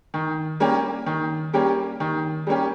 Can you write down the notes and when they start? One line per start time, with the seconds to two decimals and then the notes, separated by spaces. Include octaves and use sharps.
0.14 D#3
0.60 G3 A#3 C#4 G4
1.06 D#3
1.53 G3 A#3 C#4 G4
2.00 D#3
2.47 G3 A#3 C#4 G4